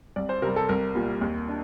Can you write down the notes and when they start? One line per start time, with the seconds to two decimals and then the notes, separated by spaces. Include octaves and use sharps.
0.16 C2 D5
0.29 C5
0.42 C3 G3 A#4
0.56 A4
0.69 C2 A#4
0.95 A#2 G3
1.21 D#2
1.48 D4